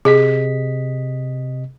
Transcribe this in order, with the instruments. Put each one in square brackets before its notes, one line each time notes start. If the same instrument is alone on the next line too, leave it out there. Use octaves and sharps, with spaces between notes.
[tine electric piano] C3 D#5 B6 [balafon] G#4